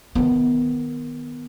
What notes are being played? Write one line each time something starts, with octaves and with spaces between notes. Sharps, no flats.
D#3 B3